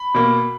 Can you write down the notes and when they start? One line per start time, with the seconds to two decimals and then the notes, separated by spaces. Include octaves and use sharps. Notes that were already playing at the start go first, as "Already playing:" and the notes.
Already playing: B5
0.14 B2 A#3